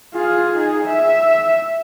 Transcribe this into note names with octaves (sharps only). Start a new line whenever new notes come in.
F4 G#4
D#4 G#4
E5